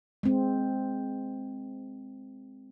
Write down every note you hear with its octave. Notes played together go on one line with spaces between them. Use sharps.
G#3 C4